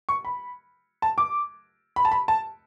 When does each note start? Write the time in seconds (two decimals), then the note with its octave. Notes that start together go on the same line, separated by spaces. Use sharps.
0.09 C#6
0.25 B5
1.02 A5
1.18 D6
1.96 B5
2.05 A5
2.12 B5
2.28 A5